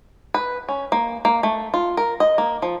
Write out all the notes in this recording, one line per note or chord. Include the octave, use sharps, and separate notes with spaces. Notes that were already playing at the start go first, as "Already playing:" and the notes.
B4
C#4
A#3
A#3
A3
F4
A#4
D#5
A#3
F3